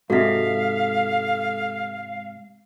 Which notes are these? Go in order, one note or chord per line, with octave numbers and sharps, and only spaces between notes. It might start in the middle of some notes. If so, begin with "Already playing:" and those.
G#2 C3 F#4 A4 E5 F5 B6